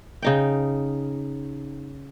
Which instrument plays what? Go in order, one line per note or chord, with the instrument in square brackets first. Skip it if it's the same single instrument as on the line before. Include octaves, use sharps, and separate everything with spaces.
[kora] C#3 D#4 G5